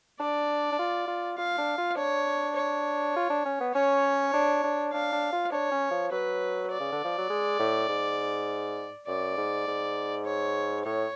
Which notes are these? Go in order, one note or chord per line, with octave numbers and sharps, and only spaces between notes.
D4 D5
D4
F4
F4
F4 F5
D4
F4
D4 C#5
C#5
F4
D4
C#4
B3
C#4 C#5
D4
D4
D4 F5
D4
F4
D4 C#5
C#4
F3
F#3 B4
D5
C#3
D3
F3
F#3
G#3
A2
G#2
F#2 D5
G#2
G#2
C#5
A2 C#5